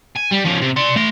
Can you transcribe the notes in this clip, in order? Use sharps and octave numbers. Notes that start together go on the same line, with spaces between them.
G#5
G3
F3 C#4
C3 C4
D5 C6
A3 C6